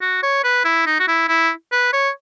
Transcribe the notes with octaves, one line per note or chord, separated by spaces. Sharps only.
F#4
C#5
B4
E4
D#4
F#4
E4
E4
B4
C#5